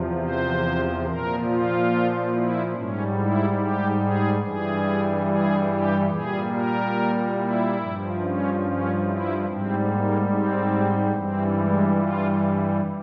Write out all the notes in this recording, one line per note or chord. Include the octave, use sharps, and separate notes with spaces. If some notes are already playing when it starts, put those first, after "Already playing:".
Already playing: E2 C3 F3
C5
A#2 F3 A#4
F4
E4
G#2 G3 C#4
E4
G4
G#4
G2 E3 G3 G#4
G#4
G4
A#2 G3 G#4
A#4
E4
G2 F3
C#4
C#4
E4
G#2 G3 C4
A#3
C4
G2 E3 G3 C4
G#3
F4